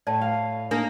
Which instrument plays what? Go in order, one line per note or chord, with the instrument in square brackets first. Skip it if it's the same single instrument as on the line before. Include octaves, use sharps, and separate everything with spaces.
[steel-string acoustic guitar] A2 C#5 [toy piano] D5 A5
[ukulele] F5
[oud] A#3 [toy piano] D4 [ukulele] D#4 A#4